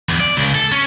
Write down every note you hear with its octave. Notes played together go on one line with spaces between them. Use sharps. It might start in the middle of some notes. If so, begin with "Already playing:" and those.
E2
D5
C#2
A4
C#4